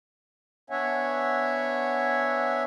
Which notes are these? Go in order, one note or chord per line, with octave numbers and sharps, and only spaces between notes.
B3 D4 C#5 E5 F#5 G#5